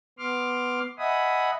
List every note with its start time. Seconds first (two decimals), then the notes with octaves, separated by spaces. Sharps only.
0.19 B3 C6 D6 F6
0.99 D#5 E5 F#5 G#5 B5 D#6